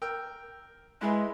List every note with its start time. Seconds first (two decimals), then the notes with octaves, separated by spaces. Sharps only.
0.02 A#4 G5 E6
1.01 G#3 E4 G#4 B4